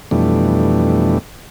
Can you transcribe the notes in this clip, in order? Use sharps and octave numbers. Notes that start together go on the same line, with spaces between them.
F2 B2 E3 G3 A3 D4